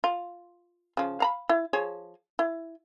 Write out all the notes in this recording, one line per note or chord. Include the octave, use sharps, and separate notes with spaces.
F4
C#3 F3
F5 A#5 B5
E4
F3 G#4 C#5
E4